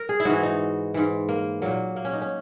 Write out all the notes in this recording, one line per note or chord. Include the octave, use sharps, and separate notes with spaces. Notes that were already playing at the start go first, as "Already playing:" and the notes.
Already playing: A#4
G#4
E4
G#2 E3 F#4
D#4
G#2 E3
A#3
A#2 F#3 A#3
A#3
C#4
D#4
C#4